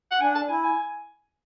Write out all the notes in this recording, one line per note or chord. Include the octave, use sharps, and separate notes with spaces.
F#5
D4 G#5
A5
E4 G#5
G#5